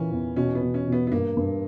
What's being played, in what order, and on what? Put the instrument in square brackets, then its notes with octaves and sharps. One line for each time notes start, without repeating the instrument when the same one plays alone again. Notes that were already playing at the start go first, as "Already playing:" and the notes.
Already playing: [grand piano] A#2 E3 A#3 [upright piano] C#4
[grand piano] E2
[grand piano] B2 [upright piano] C#4
[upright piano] B3
[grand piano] B2
[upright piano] C#4
[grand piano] B2
[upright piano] B3
B3
[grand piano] G2 [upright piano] A#3
[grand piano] G2